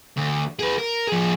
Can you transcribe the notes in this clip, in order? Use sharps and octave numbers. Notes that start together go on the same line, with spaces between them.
D2
G#4 B4
A#4
F3 G#4